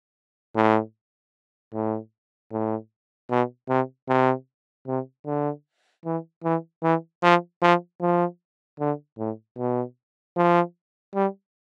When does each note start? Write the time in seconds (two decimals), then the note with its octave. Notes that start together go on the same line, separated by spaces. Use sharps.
0.56 A2
1.74 A2
2.52 A2
3.30 B2
3.69 C3
4.09 C3
4.87 C3
5.26 D3
6.05 E3
6.44 E3
6.83 E3
7.23 F3
7.62 F3
8.01 F3
8.80 D3
9.19 A2
9.58 B2
10.37 F3
11.15 G3